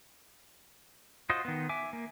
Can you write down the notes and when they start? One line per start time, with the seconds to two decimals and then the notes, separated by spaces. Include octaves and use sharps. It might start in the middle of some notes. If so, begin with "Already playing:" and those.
1.30 F4 F#4 C5 D#5
1.45 D#3 B3
1.69 E5 G#5 D6
1.93 A#3